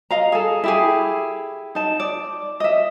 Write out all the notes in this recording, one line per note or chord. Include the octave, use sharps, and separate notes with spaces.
D#5 F5 A#5
G#4 A4
E4 G4 G#4
D#4 A5
D5
D#5 E5